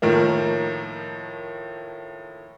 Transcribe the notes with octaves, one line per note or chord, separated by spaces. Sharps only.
A2 D#3 F3 A#3